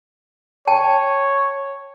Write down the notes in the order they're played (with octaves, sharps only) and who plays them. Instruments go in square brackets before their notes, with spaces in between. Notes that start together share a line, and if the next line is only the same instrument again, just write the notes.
[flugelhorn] C#5 [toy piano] G5 A5